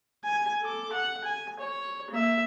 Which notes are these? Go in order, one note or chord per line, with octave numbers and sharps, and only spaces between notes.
G#5
A4 D6
F#5
G#5
C#5
A#3 E5